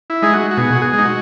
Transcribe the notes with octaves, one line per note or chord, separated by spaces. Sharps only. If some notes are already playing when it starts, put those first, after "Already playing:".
E4
G#3 D#4 G#4
F#4
F#4
B2 G#4
F#4
G#4
G#3 D#4
F#4